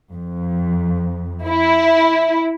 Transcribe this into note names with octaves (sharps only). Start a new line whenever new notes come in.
F2
E4